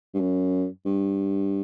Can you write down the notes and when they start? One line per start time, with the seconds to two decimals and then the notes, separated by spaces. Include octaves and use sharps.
0.14 G2
0.20 F#2
0.86 G2